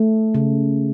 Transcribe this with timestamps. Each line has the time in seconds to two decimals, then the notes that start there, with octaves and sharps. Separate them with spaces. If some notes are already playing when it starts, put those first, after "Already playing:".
Already playing: A3
0.34 C#3